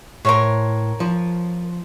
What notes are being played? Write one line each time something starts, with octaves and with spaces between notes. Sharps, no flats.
A2 A#4 C5 C#5
F3